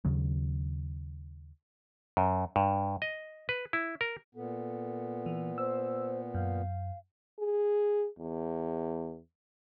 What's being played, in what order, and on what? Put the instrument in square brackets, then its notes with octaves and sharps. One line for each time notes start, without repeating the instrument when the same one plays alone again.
[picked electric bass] D#2 C#3 F#3
[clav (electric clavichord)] F#2
G2
D#5
B4
E4
A#4
[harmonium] A#2 B3 [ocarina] A4
[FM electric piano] E3
[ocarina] C5 [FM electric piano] E6
[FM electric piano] F#2 [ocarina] F5
[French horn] G#4
E2